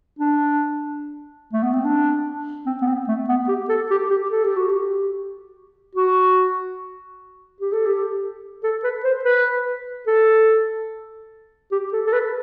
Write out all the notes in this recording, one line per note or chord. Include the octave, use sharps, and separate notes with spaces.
D4
A3
B3
C4
D4
C4
B3
C4
A3
B3
G4
A4
G4
G4
A4
G4
F#4
G4
F#4
G4
A4
G4
A4
B4
C5
B4
A4
G4
A4
A4
B4